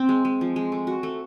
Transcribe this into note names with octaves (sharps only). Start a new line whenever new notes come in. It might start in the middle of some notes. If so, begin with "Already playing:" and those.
Already playing: C4
G#3
G#3
F3
G#3
A3
F#4
A3